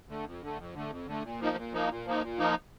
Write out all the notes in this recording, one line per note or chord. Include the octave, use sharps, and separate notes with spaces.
D3 A3
F2
D3 A3
F2
D3 A3
F2
D3 A3
A#2
F3 A#3 D#4
A#2
F3 A#3 D#4
A#2
F3 A#3 D#4
A#2
F3 A#3 D#4